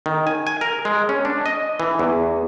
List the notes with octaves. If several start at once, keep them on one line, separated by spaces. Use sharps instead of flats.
D#3
G#5
G#5
A#4
G#3
C#4
D4
D#5
E3
E2